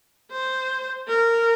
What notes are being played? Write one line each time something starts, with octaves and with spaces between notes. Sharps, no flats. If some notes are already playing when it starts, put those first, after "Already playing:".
C5
A#4